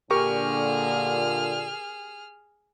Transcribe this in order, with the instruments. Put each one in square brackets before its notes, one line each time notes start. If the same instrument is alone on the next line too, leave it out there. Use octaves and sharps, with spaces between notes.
[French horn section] A#2 D3 [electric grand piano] G4 A#4 C#6 [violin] G#4 F6